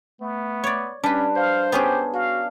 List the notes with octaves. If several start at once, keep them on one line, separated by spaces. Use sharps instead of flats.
A3 B3
C#5 D5
G3 C#4 D4 B4
C5 F5
B3 C#4 G4 G#4
F#4 F5